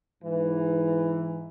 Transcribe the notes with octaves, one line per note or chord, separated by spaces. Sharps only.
G#2 E3